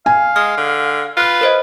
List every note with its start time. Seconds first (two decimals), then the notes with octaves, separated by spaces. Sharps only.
0.06 F5 G#5
0.36 G#3 F6
0.58 D3
1.17 F4 B4
1.41 A#4 C5 D#5